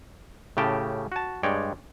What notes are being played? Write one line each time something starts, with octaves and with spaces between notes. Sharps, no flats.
A2 C#3 G4 G5 A5
F#4 A5
G2 G#3 C#5 D5 G5